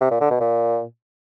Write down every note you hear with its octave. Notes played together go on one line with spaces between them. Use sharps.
C3
A#2
D3
B2
A#2